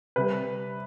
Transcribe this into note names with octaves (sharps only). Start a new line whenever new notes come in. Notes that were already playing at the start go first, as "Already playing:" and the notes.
C3 G3 B4